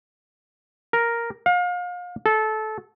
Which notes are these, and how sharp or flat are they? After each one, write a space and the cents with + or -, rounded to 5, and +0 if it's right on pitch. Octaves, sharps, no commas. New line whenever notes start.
A#4 +0
F5 +35
A4 -20